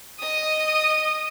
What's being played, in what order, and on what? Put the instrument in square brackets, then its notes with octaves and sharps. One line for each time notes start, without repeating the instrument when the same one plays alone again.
[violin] D#5 D#6